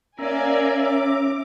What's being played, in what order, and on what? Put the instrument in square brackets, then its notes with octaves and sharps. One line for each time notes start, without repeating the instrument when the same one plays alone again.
[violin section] A#3 D5 G#5 [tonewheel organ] C#4 E5 A#5
[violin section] D6